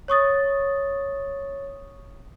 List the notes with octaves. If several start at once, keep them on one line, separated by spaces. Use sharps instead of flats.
C#5 C#6 D#6 A6